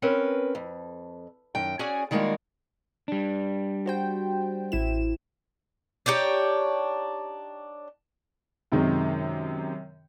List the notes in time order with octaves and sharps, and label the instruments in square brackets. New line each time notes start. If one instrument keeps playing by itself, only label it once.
[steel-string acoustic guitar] C4 C#4 A#4 B4
F2
F#2 D#3 G5
C#4 F#4 G#4 D5 G#5
D#3 G3 G#3 A#3 F4 F#4
[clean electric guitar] G3 D4
[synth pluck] F#4 C5 G5
A1 E4 E7
[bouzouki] D4 D#4 G4 C#5
[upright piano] F#2 C3 D#3 G#3